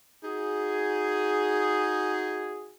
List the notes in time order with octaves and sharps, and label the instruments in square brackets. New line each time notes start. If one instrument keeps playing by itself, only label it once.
[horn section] D#4 F#4 G#4